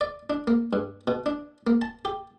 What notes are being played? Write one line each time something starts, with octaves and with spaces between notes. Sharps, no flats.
D5
D4
A#3
G2
B2
D4
A#3
A5
G4